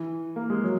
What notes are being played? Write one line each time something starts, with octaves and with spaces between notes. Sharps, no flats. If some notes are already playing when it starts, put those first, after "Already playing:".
Already playing: E3
A#3
G#3
F#3